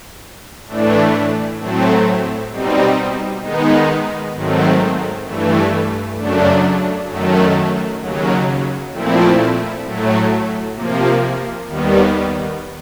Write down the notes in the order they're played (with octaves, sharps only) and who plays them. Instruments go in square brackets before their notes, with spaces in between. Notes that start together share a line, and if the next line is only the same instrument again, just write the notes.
[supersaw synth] A2 E3 A3 D4
A2 F#3 A3 C4
B2 G3 C4 D#4
D#3 G#3 B3 D#4
G#2 D#3 F#3 A3 C4
G2 E3 A3
F#2 C#3 F#3 A3 D4
F#2 D#3 F#3 A3
D#2 C#3 F#3
A#2 F3 A3 C4 E4
A2 F#3 A3
C3 F3 A#3
D#2 D#3 G3 B3